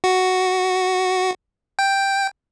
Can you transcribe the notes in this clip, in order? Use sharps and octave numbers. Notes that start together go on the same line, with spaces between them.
F#4
G5